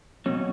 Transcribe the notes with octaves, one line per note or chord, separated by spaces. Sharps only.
B2 F#3 C#4